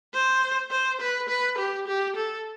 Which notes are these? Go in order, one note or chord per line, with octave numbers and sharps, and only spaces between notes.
C5
C5
B4
B4
G4
G4
A4